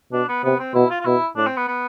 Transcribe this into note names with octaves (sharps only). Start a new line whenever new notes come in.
B2 D4
B3
C3 B3
C4
B2 E4
F4
F4
B2 E4
A2 D4
C4
B3
B3